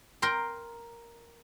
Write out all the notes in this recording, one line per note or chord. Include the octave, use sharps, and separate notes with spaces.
A#4 G5 C6